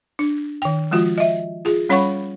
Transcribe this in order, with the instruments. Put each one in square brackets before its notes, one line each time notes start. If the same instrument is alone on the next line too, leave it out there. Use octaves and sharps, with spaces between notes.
[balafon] D4
D#3 G5
F3 G#3 F4 F#4
D#5 E5
F4 G#4
G3 C#4 C#5 F#5 B5 C#6